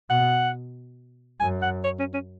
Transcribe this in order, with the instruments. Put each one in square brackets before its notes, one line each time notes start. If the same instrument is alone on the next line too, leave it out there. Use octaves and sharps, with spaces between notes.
[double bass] B2 [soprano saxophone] F#5
[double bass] F#2 [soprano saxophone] G#5
[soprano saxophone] F#5
C#5
C#4
C#4